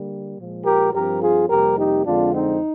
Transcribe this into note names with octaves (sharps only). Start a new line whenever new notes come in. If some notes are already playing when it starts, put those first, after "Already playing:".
Already playing: D3 G3 A#3
A#2 F3 G#3
G4 A#4
G2 F3 C4 G4 A#4
F4 G#4
F2 C3 G3 A#3 G4 A#4
D#4 G4
F2 D3 G#3 C4 D4 F4
C4 D#4